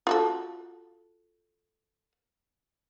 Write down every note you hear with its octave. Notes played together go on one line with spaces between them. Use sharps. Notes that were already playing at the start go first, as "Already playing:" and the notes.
F4 F#4 A4